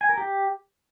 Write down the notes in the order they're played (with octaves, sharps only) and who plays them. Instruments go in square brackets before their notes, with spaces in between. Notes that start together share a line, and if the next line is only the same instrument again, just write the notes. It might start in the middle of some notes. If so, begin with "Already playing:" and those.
[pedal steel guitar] G#5
A#4
G4